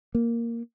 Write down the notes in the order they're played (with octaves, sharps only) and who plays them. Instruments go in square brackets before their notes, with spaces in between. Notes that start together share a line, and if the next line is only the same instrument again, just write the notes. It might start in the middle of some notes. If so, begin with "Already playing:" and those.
[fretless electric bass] A#3